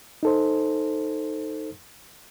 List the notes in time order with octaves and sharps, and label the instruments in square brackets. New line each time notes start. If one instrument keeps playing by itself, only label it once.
[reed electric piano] D#4 A4 C5